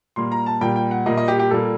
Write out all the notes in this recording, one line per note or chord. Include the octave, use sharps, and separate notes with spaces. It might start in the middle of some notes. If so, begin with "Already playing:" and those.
A#2 G3 A#3 C6
A#5
A5
A#2 G3 A#3 G5
G5
F#5
A#2 G3 A#3 D#5
D#5
G4
G4
A#2 G3 A#3 A4